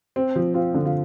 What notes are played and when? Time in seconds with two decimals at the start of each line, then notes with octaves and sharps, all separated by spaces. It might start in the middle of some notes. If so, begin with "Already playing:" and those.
0.16 C4
0.36 F3
0.54 C4 F4
0.74 D3
0.86 F4